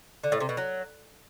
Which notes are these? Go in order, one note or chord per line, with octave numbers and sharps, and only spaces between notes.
D3
A2
C3
B2
F#3